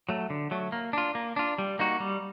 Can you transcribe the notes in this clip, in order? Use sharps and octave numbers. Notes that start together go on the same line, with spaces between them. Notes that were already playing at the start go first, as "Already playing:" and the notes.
F#3 A3
D3
F#3 A3
A#3
D4 F4
A#3
D4 F4
G3
A#3 D#4 F#4
G3